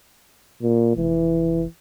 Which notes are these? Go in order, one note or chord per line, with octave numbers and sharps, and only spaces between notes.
A#2
F1 E3